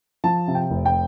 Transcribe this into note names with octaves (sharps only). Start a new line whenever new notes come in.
F3 A5
C3
G5
F1
G5